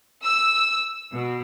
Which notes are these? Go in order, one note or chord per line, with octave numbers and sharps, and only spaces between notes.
E6
B2